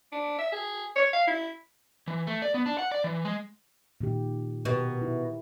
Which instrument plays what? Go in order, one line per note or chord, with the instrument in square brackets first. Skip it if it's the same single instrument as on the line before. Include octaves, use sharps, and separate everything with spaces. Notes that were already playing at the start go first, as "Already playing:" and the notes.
[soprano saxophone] D4
E5
G#4
C#5
F5
E4
[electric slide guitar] E3
A3
D5
B3
D4
F#5
D5
E3
G#3
[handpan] A#2 D#3 G4
[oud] B2 [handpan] G4 A#4
[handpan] E4